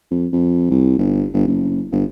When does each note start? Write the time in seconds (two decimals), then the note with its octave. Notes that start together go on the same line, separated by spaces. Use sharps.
0.11 F2
0.32 F2
0.70 C2
0.98 G1
1.33 G1
1.47 F#1
1.92 G1